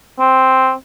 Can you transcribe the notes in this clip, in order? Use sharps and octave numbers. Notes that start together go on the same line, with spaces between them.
C4